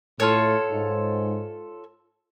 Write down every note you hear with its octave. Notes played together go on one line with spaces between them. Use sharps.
A2 F4 A4 C#5
G#2